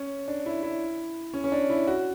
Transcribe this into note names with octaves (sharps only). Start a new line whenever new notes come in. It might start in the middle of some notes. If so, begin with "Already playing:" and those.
Already playing: C#4
D4
E4
E4
C#4
C#4
D4
E4
F#4